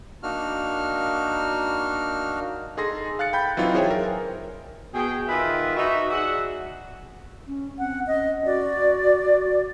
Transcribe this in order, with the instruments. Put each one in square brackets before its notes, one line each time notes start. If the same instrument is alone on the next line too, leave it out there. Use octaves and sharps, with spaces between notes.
[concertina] A#3 D4 D#4 F#4 F6
[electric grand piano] D#4 G#4 A4 C6 A#6
F5 F#6 A6 C#7
G5 B5 G6
E3 F#3 C4 D#4 F4
G#4 C5 C#5 E5 G5 G#5
A#4
[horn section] B2 G#4 G5
D#3 F4 G#4 B4 E5
D#4 F#4 E5
F#4 G#4 D5 E5 F#5
[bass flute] C#4
[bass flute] C4 [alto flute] F#5
[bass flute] C#4 [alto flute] D#5
[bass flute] F#4 [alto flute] D5